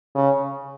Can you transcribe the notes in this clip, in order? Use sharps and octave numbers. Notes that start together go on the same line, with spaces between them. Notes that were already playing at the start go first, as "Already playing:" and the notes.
C#3